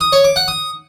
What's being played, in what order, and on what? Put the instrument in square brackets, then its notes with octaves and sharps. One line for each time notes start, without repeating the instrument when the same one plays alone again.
[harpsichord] D#6
C#5
D6
F#5
D#6